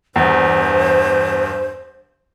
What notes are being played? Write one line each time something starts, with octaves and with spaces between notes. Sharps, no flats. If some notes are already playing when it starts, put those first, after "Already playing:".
E2 G2 C5